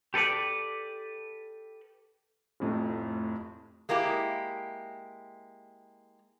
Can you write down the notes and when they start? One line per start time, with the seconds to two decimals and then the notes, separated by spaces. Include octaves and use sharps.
0.14 G4 A4 B4 D5
2.60 F1 F2 A2
3.89 G#3 A#3 E4 G4